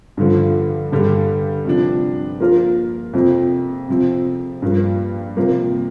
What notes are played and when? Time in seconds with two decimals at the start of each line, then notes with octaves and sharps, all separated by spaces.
0.17 G2 D3 F3
0.92 G2 D3 G3
1.65 C3 F3 D4
2.40 F3 A#3 F4 A#4
3.13 F2 C3 F3
3.89 C3 F3 C4
4.62 G2 F3 A#3
5.37 C3 F3 A#3